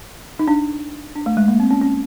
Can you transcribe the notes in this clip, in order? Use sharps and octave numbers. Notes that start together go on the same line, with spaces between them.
D#4
D4
D4
A3
G#3
A#3
C4
C#4
C#4